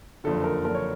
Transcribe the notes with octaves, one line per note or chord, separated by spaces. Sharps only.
F#1 F2 D3 A4
A#4
F#1 F2 D3 A#4
C#5